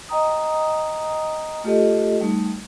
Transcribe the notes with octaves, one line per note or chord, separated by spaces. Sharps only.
D#5 G5 A#5 D#6
A3 F4 G4 A4 D#5
G3 A3 D#4